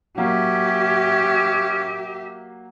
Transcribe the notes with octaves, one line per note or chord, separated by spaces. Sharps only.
F#3 A#3 C#4 G4 E5 F5